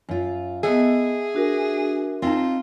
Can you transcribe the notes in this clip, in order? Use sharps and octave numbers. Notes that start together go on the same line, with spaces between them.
F#2 F4
B3 G#4 A4 D#5 E5 F#5
D4 F#4 A#4
C4 D#4 F4 A5